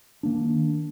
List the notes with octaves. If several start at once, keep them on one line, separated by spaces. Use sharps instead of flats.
D#3 A#3 D4